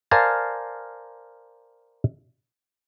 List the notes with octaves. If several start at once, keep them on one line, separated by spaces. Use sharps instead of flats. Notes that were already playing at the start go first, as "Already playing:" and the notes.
A#4 C5 D5 F5 G#5 A5